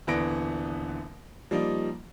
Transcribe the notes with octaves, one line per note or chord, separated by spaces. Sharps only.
D#1 D3 E3 B3 A#6 D7
F3 G3 A#3 D#4